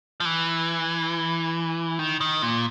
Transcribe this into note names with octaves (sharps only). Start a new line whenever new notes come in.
F3
E3
D#3
D#3
A#2